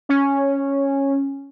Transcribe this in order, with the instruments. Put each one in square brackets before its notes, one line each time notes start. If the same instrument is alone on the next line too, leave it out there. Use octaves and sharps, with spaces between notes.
[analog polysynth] C#4